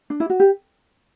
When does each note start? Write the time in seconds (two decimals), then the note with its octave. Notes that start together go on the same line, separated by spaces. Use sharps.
0.10 D4
0.20 E4
0.30 F#4
0.40 G4